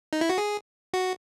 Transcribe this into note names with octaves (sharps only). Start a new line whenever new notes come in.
D#4
E4
F#4
G#4
F#4